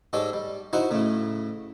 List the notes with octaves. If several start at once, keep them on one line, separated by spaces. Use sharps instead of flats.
G#2 G#3 G4 A4 C#5 D5
G3
D#4 E4 F#4 C5 C#6
A2 C#3 A3